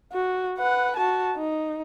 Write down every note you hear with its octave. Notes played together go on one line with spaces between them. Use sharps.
F#4
B4 F#5
F#4 A5
D#4